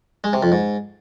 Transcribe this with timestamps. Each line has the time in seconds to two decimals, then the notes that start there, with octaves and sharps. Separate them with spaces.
0.24 G#3
0.33 C3
0.43 F2
0.52 G#2